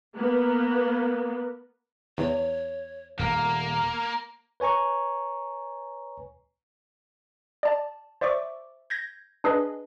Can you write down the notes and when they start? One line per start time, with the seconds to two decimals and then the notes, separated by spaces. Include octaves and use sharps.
0.16 A#3 B3
2.18 E2 C#5
3.19 D#1 A#3 A#5
4.60 B4 C#5 G#5 A#5 C#6
7.63 D5 A5
8.21 C5 D5 E5 C#6 D6
8.90 G6 G#6 A#6
9.44 D4 G#4 B4 D#5